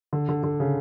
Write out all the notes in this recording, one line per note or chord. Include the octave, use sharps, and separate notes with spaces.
D3
D3
D3
C#3